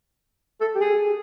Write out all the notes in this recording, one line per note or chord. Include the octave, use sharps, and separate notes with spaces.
A4
G4
G#4